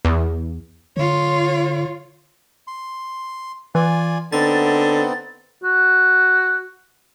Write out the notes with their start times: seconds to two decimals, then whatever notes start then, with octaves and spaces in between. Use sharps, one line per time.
0.05 E2
0.97 D3 F4 C#5
2.67 C6
3.75 E3 F4 D5 G#5
4.32 D3 B3 C4 D#4 A6
5.64 F#4